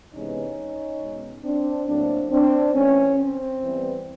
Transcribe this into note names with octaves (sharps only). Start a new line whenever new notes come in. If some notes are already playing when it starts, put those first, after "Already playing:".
C3 E3 G#3 B3 C#4 D#4
B2 G#3 B3
C4 D4
A2 F#3 A#3 C4 D4
C4 D4
E3 A3 C4 C#4
C4
E3 G3 B3